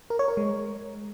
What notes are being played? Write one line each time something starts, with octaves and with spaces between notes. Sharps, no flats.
A#4
C#5
A#4
G#3